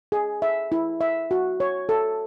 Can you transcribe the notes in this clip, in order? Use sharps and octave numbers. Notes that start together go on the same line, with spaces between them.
G#4
E5
E4
E5
F#4
C#5
A4